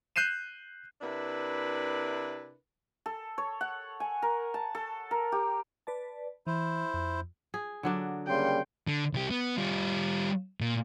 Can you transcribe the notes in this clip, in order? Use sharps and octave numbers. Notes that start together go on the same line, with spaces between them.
F#6 G6 C7 D#7 E7
C3 D4 E4 A#4 B4
A4
C#5
F#5
G#5
A#4
A5
A4
A#4
G4
B4 D5 A5
E3 E4 C5
F2
G#4
D3 F#3 D4
C#3 G3 A#3 G5 C6
D3
C2 G4
B3
G3 F4
A#2